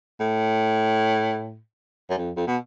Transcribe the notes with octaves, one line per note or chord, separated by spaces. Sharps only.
A2
F#2
F2
F2
B2